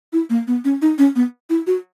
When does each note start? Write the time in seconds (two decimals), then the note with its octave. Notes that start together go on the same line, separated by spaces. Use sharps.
0.13 E4
0.30 A#3
0.47 B3
0.65 C#4
0.82 D#4
0.98 C#4
1.16 B3
1.50 E4
1.67 F#4